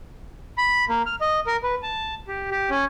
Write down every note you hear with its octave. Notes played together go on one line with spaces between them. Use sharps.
B5
A#3
F6
D#5
A#4
B4
A5
G4
G4
C#4